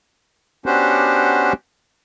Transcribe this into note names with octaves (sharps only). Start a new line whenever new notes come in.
B3 C#4 D4 F#4 G4 C5